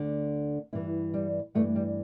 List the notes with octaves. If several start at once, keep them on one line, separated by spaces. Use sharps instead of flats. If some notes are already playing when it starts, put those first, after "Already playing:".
Already playing: D2 D3
G2 E3 E4
G3
G2 E3 A3
G3